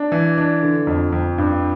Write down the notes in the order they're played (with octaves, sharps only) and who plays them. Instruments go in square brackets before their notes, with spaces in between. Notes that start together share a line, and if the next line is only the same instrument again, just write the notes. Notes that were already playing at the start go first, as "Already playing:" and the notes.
Already playing: [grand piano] D4
E3
D4
D3
F2
F2
G2